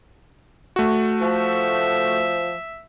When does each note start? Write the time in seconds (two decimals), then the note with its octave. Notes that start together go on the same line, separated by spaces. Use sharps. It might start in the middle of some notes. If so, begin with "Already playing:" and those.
0.76 A3 F#4
1.21 F3 E5